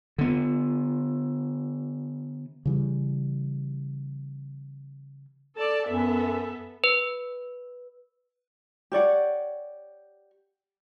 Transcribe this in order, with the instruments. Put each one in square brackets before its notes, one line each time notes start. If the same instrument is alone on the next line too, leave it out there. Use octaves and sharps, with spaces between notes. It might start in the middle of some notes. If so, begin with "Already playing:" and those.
[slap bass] D3 B3
[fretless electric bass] C#3 E3 G3
[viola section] A4 D5 A5
[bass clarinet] F#2 [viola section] B3 A4 E5
[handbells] B4
[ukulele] G4 C#5 D5 F#5